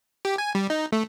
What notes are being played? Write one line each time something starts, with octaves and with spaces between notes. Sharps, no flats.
G4
G#5
G3
D#4
A3